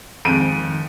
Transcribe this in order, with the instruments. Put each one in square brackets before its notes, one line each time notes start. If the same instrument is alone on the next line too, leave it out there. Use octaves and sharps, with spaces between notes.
[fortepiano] F2 G#2 [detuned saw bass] D#3 [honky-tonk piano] D7 D#7